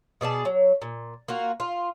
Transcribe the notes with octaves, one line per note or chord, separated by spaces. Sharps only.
B2 G#4 D5 A5
F#3
A#2
A#3 F4 F#4
F4